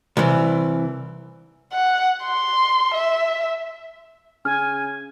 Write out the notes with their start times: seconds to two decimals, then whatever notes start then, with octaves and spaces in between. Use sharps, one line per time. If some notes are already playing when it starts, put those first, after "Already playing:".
0.17 C2 E3
1.73 F#5
2.24 C6
2.94 E5
4.45 C#3 G#5 F6